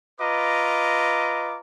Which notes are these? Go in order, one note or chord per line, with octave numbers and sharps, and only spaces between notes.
F4 B4 D#5 A#5 D6